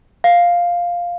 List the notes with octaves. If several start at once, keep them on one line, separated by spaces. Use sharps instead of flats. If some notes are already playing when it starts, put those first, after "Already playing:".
F5